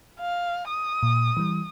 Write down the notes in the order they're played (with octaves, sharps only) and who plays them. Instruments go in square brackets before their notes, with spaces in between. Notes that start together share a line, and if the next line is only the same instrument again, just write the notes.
[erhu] F5
D#6
[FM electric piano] A#2
E3 G3